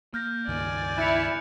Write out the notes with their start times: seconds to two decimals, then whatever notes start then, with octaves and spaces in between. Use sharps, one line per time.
0.14 A#3 F6 G6 A#6
0.48 C#2 G2 D#3 D5 G#5
0.98 E4 F#6 C#7 F7